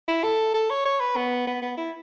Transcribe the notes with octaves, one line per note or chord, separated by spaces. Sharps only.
E4
A4
A4
C#5
C#5
B4
B3
B3
B3
E4